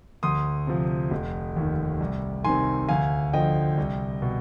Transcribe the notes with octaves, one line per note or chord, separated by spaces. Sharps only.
D2 C6 D#6
C3 F3
F1
D#2 D#3
C2
C3 D#3 G#5 C6
D2 F5 G#5
D3 F3 D#5 G5
C2
B2